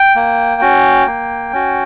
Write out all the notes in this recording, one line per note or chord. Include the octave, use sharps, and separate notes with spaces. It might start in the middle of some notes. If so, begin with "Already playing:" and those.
Already playing: G5
A#3
C#4 F#4
A#3
C#4 F#4